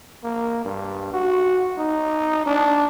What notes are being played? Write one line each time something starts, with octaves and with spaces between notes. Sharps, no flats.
A#3
G2
F#4
D#4
D4